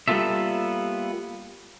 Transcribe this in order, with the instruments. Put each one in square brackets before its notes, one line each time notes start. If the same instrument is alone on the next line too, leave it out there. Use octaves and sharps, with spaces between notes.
[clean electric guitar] G3 A#3 B3 F4 A4 E5